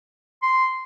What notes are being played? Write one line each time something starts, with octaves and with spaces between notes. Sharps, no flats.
C6